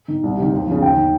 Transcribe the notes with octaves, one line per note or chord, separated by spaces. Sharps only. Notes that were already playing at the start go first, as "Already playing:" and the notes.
D#3
C2
C3 D#3
D#2
C#3 F3
D#2 G5
D#3